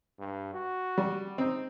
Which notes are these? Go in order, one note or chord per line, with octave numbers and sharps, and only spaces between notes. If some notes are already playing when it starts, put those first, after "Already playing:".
G2
F#4
G3
C4 D#4